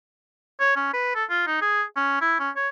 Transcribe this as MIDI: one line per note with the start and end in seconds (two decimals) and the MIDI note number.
0.60 0.76 73
0.76 0.92 61
0.94 1.14 71
1.15 1.24 69
1.30 1.44 65
1.47 1.58 63
1.61 1.83 68
1.96 2.21 61
2.21 2.36 64
2.40 2.50 61
2.56 2.69 73